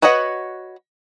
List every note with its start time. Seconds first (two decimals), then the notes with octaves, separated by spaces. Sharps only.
0.02 F#4 B4 C#5 D#5 F#5